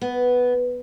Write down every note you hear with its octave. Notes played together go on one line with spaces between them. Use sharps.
B3